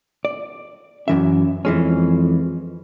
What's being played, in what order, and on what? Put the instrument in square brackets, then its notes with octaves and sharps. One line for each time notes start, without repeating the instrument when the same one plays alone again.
[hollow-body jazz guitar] D5
[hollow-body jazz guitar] F#2 E3 E5 [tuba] C#4
[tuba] F2 [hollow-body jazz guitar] E3 G#3 C#4